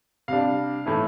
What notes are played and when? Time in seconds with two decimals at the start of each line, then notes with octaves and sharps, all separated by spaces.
0.28 C3 G3 D4 F5
0.85 A2 E3 A3 E4